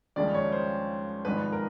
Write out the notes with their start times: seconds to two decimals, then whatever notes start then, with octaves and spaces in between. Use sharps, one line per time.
0.16 D#2 C#3 F3 G#3 D5
0.34 C#5
0.52 C5
1.25 G#1 G#2 F3 G#3 B4
1.52 A#4